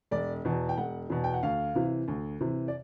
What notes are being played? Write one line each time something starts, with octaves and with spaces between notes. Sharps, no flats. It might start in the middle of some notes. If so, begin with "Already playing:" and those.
E1 D5
E2 B2
G5
E1 F#5
E2 B2
G5
F#5
D2 F5
C3 E3
D2
C3 E3
D5